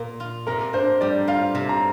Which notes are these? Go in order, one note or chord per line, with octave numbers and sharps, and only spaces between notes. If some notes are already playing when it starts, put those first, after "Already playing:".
Already playing: A#2 A#3
F4
C3 A#4
D4 C5
G3 D5
F4 F5
C3
A#5